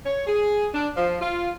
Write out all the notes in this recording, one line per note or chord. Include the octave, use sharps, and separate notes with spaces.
C#5
G#4
D4
F3
F4